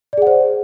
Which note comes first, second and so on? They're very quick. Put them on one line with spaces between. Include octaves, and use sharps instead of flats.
D5 G#4 F#5 C5